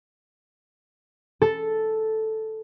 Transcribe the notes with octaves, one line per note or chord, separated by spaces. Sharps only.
A4